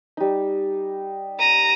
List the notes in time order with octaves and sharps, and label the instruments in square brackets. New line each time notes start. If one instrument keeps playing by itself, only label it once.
[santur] G3 D#4
[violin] A#5 D#7